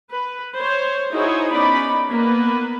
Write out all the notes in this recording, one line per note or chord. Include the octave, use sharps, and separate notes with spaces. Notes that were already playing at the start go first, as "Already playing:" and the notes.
B4
C5 C#5
D#4 E4 F#4 G#4 C5 C#5
B3 C#4 D#4 D5 B5
A#3 B3 B4